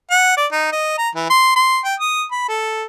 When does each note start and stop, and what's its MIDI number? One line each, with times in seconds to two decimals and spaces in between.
0.11 0.34 78
0.37 0.46 74
0.52 0.68 63
0.72 0.94 75
0.98 1.09 82
1.15 1.27 52
1.30 1.55 84
1.56 1.79 84
1.85 1.95 79
2.00 2.24 87
2.32 2.46 83
2.48 2.85 69